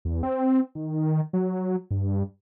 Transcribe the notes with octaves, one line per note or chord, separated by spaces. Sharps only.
E2
C4
D#3
F#3
G2